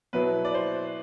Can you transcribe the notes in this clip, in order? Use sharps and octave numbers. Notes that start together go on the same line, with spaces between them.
B2 F#3 B3 E4 B4
D5
C5